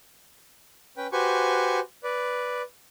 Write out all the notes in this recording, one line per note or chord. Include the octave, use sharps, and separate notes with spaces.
C#4 B4 G5
F#4 G4 B4 C5 G#5 C#6
B4 D5